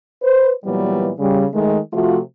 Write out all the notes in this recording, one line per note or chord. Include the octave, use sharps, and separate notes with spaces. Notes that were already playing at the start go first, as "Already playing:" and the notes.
B4 C5
A#2 E3 F#3 G3 B3
C#3 G3
D#3 G#3 A3
C3 F3 A3 F4 F#4